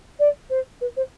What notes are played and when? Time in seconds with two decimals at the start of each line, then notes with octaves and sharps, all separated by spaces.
0.19 D5
0.50 C5
0.81 B4
0.96 C5